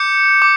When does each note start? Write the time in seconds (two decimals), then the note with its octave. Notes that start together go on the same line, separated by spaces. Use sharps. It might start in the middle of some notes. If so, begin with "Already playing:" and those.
Already playing: D6 G6 C#7
0.42 D6